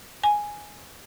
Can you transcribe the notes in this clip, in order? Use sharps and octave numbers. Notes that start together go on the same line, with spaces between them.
G#5